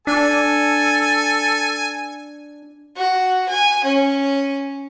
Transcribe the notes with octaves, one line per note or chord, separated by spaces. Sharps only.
D4 A4 G#5
F#4
G#5
C#4